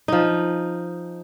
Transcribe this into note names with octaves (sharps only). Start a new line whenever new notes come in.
F3 D#4